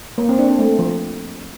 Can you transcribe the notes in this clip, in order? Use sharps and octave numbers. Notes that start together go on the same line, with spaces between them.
A#3
C4
D4
C4
A3
F3